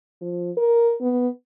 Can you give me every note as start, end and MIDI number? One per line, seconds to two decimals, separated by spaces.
0.21 0.51 53
0.57 0.95 70
1.01 1.28 59